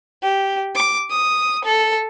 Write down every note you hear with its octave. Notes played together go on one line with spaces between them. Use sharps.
G4
D6
D#6
A4